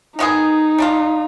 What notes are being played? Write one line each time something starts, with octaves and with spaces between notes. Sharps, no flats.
D#3 B3 D#4 F4 G#4
G3 D4 F4